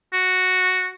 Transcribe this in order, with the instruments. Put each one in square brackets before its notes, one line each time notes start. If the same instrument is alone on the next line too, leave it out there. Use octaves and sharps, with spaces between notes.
[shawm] F#4